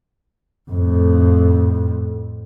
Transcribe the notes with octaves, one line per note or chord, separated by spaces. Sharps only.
F2 A2